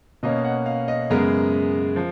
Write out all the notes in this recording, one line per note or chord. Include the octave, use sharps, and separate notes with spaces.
B2 A#3 C#4 D#5
F#5
F5
D#5
F#2 C#3 G#3 B3 A#4
F3